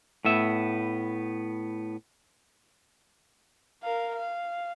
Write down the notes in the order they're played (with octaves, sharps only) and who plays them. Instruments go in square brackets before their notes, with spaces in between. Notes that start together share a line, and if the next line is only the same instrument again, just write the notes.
[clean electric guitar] A2 B3 E5
[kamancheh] A#4 F5
F5